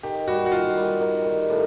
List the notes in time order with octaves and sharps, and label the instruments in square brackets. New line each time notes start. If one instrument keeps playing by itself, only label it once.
[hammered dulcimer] D#3 [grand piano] G4
[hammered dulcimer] G3 [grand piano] F#4
[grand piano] F#4
[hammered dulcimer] D#3 [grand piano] F4
[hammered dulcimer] G3
D#3
D#3
A2